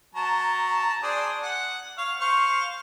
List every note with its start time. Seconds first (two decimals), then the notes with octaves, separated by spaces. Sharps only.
0.15 F#3 A5 A#5
1.03 D4 G#4 C5
1.43 F#5
1.98 C#5 F5
2.20 C5 F5 C#6